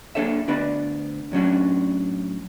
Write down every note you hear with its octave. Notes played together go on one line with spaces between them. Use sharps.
A#3 D4 A4 C#5 E5
D2 B3 D4 B4 D5 B5
A2 F#3 C#4 D4